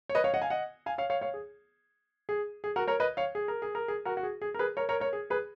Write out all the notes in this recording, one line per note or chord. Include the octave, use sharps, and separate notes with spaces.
C#5
B4 D#5
C#5 F5
D#5 F#5
F5 G#5
D#5 F#5
F5 G#5
C#5 F5
C#5 F5
C#5 F5
G#4
G#4
G#4
F#4 A#4
A#4 C#5
B4 D#5
C#5 F5
G#4
A#4
G#4
A#4
G#4
F#4 A#4
F#4
G#4
G#4
A#4
G#4 B4
A#4 C#5
A#4 C#5
A#4 C#5
G#4
G#4 B4